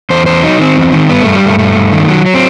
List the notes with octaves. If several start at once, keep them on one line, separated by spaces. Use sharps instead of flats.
E2 C5
E2 C5
F#3 D#4
D#3 C4
E2
D#3
G2 B3
G2 A3
G3
G2 A3
G2 A3
G2
D#3
F#3
F#3
C4